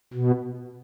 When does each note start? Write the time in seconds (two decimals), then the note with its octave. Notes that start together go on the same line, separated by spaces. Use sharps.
0.14 B2